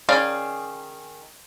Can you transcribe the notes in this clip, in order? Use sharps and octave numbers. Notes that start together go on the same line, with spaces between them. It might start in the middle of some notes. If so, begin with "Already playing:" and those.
D#3 C#4 G#4 D5 F5